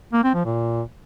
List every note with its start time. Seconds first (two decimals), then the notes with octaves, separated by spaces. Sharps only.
0.13 A#3
0.24 C4
0.34 F3
0.45 A#2